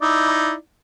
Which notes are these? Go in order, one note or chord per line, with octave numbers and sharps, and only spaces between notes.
D#4 E4 D5